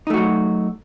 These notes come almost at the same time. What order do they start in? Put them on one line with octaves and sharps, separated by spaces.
D#4 A3 F#4 F#3